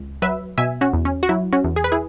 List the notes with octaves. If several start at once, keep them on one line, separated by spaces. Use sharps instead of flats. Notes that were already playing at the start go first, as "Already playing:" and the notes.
Already playing: C#2
F#3 B4 E5
B2 E5 G#5
C#4 F#4
E2
C#4
F#4
F#3 E4
C#4 F#4
E2
G#4
B4
E4 G#4